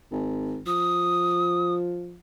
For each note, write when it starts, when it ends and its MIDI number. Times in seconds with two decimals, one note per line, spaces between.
0.12 0.60 32
0.67 2.18 53
0.67 1.74 87